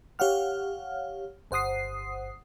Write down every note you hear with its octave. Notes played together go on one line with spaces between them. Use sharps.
G4 C#5 F5 F#5 F6
G1 C5 F#5 D#6 C7